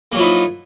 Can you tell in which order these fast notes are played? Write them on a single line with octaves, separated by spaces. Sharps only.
A#3 F#3 F3 E4 D#4